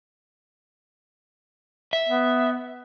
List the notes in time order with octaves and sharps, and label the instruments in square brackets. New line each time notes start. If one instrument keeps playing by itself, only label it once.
[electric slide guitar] E5
[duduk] B3